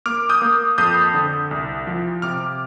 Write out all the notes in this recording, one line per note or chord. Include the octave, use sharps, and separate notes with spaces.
A#3 D6 F6
D#6 G6
A#3
F2 D#6 G6
D3
C2
F3
C3 D6 F6